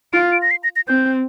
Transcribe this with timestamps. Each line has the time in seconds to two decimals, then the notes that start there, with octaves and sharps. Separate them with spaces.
0.13 F4 D7
0.32 D7
0.42 A#6
0.51 C7
0.64 A#6
0.76 A#6
0.88 C4 G6